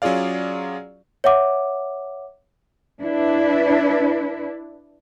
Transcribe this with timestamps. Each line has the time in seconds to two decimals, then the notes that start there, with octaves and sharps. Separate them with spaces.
0.02 F#3 C#4 F4 G#4 D5 F5
1.24 C#5 E5 F#5 D6
3.00 D4 E4 B4